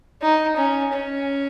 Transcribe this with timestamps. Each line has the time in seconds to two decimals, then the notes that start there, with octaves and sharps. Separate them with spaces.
0.22 D#4
0.57 C#4
0.93 C#4